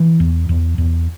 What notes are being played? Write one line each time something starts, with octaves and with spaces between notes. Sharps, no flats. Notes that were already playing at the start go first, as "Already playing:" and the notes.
Already playing: E3
E2
E2
E2